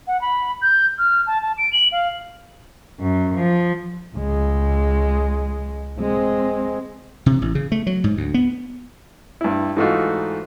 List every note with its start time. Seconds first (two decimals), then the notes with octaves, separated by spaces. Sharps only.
0.07 F#5
0.21 B5
0.62 G6
0.99 F6
1.27 A5
1.42 A5
1.58 D7
1.73 F#7
1.92 F5
2.99 F#2
3.35 F3
4.16 C#2 G#3
5.99 G#3 C4
7.26 C3
7.42 A1
7.55 C#3
7.72 A3
7.87 F#3
8.04 G#2
8.17 D2
8.34 B3
9.41 G2 E4
9.77 G#2 E3 A3 D#4 F4 F#4